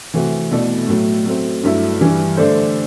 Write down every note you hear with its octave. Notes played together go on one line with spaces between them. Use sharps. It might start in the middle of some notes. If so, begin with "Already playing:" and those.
C3 E3 A3 C4 F#4
B2 A3 E4 A4 D5
A2 F#3 A3
F#3 A3 C4
G2 F#3 A3 E4
G2 E3 G3
D3 A3 D4 A4 C5